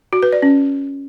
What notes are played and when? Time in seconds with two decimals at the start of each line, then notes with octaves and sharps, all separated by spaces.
0.13 F#4
0.23 B4
0.32 D5
0.42 C#4